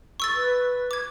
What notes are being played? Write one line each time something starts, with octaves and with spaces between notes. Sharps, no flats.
C#6 E6 A6
B4
D6 G#6